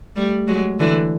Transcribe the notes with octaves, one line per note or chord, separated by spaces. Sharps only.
G3 A3
F#3 G#3
D3 E3